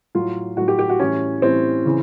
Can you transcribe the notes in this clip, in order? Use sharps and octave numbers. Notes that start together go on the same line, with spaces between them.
A2 F#3 F4
A2 F#3 F#4
G4
G4
F#4
A2 E3 G3 C#4
A2 E3 G3 C4
C#3 E3